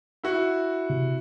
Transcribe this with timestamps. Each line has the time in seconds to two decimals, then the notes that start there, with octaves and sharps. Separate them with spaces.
0.24 E4 F#4
0.90 C3